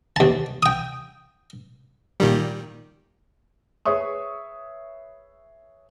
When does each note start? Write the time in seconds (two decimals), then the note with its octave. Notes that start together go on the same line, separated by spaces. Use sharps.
0.16 D#2 A5
0.63 G5 D#6
2.20 A#2 D#3 G3
3.85 G#4 B4 C#5 E5 C#6 D#6